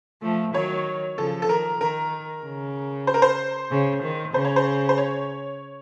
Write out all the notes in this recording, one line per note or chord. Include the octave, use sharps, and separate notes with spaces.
F3 A3
D#3 F#3 C#5
C#3 F3 A4
A4
D#3 A#4
D#3 A#4
C#3
C5
A#4
C5
C#3
D#3
C#3 C5
C#5
C5
C5
C#5